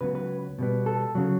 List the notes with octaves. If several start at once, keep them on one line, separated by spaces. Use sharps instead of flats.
C#2 C#3 F#3 B3 B4
B4
B2 G3 B3
A4
C#3 F#3